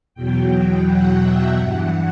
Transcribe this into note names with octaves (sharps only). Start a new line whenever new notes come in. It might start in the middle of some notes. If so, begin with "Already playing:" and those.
E2 B2 F#3 G5
F#5
E5
G2 E3 F#5